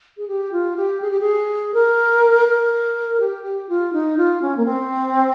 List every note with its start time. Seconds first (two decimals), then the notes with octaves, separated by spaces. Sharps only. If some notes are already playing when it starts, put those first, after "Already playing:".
0.18 G#4
0.28 G4
0.52 F4
0.77 G4
1.02 G#4
1.11 G4
1.20 G#4
1.74 A#4
2.48 A#4
3.20 G4
3.44 G4
3.69 F4
3.93 D#4
4.18 F4
4.42 C#4
4.57 A#3
4.65 C4